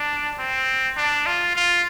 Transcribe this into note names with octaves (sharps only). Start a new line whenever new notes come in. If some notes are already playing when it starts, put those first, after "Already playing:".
Already playing: D4
C4
D4
F4
F4